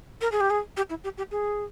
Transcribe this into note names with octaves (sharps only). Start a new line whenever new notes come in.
A#4
G#4
G4
G#4
G4
E4
G4
G4
G#4